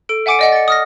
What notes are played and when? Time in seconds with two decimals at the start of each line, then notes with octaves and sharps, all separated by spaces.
0.09 A4 D7
0.26 E5 F#5 G#5 D6 C#7 D7
0.39 D5 D#5 F#5
0.52 A6 C#7
0.68 D#6 F6 A#6